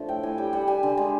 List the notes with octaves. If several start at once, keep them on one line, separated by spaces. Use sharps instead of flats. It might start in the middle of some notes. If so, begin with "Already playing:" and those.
Already playing: D3 F3 A3
A2 G5
A2 G#5
G3 G5
G3 F#5
G3 G#5
D3
G#3